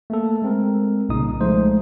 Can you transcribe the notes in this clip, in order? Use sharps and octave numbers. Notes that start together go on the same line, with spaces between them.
A3 A#3 A4
G#3 C4 A#4
C2 A#2 C#3 D#4 D#6
F3 G#3 A3 D#4 C5